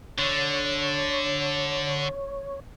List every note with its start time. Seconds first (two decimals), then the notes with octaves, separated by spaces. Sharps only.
0.18 D3 C#5